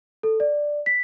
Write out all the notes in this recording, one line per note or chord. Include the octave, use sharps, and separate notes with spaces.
A4
D5
B6